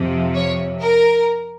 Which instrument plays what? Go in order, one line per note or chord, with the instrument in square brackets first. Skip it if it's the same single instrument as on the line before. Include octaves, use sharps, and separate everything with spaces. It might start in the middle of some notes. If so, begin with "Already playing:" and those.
Already playing: [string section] F2 C3 F3
C#5
A#4